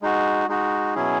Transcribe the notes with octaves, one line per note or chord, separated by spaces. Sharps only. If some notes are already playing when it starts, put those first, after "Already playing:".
G#3 D#4 F#4
G#3 D#4 F#4
B2 F#3 C#4 E4 G#4